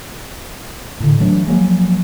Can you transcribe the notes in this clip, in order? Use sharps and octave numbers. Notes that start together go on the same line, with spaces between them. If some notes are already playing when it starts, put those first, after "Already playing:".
A2 D3
E3 F#3 A3 D4
F3 F#3 G#3 A#3